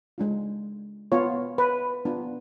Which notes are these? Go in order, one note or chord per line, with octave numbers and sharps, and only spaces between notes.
G#3 D4 F4
B3 F4 C#5
B4
B3 D4 F4